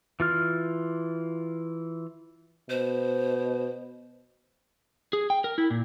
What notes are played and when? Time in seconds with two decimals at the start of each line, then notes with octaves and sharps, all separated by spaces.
0.20 E3 F4 F6
2.70 B2 C5
5.13 G#4
5.30 G5
5.44 A#4
5.58 E4
5.70 A#2